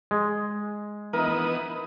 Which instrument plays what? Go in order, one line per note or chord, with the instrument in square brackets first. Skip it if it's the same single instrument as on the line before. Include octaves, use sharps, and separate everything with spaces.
[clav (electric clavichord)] G#3
[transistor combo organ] E3 B3 D#6 [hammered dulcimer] D#4 A#4